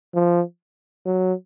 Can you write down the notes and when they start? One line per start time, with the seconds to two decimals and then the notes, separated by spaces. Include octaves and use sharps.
0.14 F3
1.06 F#3